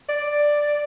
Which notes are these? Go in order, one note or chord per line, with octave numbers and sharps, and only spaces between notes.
D5